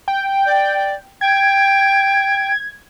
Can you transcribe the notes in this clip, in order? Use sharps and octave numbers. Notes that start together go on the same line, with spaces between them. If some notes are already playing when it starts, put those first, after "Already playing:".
G5
D5
G5 G#6